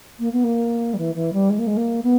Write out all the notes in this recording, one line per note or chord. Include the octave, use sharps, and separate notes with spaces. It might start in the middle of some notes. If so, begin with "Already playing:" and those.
A#3
B3
A#3
G3
E3
E3
G3
G#3
A#3
G#3
A#3
B3